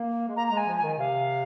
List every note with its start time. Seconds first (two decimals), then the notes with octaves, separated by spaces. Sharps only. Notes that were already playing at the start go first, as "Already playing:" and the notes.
Already playing: A#3
0.28 G#3
0.36 A#3 A#5
0.47 G#3 A#5
0.57 G#5
0.66 F3
0.77 G#5
0.83 D#3
0.98 C3 F5